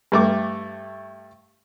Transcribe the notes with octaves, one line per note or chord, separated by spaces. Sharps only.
G2 A3 D6